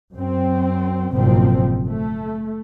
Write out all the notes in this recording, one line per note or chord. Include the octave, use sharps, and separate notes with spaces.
F#2 C4
F#1 G#2 B2 F3 C4
A3